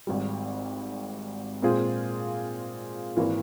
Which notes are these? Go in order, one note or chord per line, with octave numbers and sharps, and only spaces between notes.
G#1 G#2 G3
A#2 G#3 C4 F4 G#4
G#1 E3 A#3